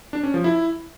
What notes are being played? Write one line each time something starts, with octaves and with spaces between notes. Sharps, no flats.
D4
C#4
F3
E4